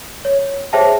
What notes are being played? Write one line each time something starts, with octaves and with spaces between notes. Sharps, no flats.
C#5
G#4 C5 C#5 E5 G5 A5